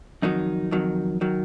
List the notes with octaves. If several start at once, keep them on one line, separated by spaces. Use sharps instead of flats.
F2 D#3 F#3 D#4
F2 D#3 F#3
D#3 F#3